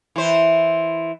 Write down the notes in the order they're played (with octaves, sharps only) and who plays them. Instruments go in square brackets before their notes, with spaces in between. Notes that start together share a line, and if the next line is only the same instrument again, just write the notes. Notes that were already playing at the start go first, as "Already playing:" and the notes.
[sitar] E3 C5